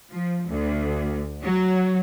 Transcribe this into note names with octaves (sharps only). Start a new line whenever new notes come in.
F3
D2
F#3